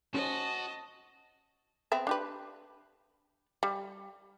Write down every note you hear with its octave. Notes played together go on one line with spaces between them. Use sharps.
C#4 F#4 C5 D#5 A5
B3 C4 E5
D4 G4 B4
G3